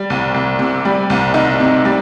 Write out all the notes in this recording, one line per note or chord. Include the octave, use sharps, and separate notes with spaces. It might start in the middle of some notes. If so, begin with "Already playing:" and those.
Already playing: G3
C2
C2
C3
G3
C2
C2 D#4
C3
G3